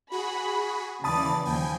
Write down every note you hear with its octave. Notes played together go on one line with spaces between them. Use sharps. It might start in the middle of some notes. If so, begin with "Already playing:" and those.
F#4 G#4 B5
D#2 C#3 E3 D5 A5 B5 D#6 A6
D#2 F3 G5 G#5